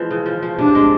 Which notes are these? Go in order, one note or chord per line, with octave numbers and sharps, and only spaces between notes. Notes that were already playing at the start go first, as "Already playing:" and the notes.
Already playing: E3 F3 G#3 B3
C#3
F3
F3
C3 D4
G#3